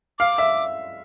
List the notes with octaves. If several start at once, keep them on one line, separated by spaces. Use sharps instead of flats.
F5 D6
E5